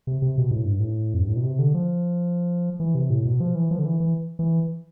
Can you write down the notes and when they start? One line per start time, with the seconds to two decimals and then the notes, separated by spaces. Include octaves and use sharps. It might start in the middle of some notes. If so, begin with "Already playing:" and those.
0.07 C3
0.22 C3
0.38 B2
0.51 A2
0.65 G2
0.80 A2
1.14 F2
1.22 G2
1.29 A2
1.36 B2
1.43 C3
1.59 D3
1.74 F3
2.80 E3
2.95 C3
3.10 A2
3.25 B2
3.40 F3
3.55 E3
3.71 F3
3.79 D3
3.85 E3
4.00 E3
4.39 E3